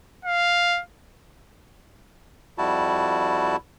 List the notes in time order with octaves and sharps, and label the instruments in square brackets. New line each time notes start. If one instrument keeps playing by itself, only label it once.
[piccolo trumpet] F5
[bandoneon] F2 G3 E4 F#4 A5